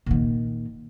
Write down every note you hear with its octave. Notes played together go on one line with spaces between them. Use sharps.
A#2 D#3